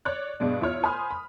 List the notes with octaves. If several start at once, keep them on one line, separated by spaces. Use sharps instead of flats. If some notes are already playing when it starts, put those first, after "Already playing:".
C#5 D5 F#6
G2 B2 G#3 D4
E2 E4 F4 C#5 F6
C5 G#5 B5 C6 D#6 F6
B5